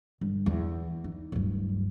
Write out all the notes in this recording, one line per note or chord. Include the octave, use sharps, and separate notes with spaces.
G1
E2
D#4
D1 G2